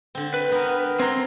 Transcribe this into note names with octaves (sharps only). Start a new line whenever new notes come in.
D3 C4
B4
B3 C4 A#4
C4 G#5 A#5 C6